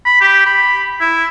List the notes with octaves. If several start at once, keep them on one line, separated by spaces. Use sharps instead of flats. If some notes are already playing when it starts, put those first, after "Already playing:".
B5
G4
B5
E4